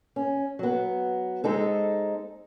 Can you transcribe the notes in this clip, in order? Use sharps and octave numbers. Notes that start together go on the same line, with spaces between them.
C#4
F#3 B3
G#3 C4 D#4 A4